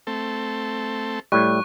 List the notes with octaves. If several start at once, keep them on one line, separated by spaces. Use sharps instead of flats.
A3 C4 A4
A2 G3 C#6 F#6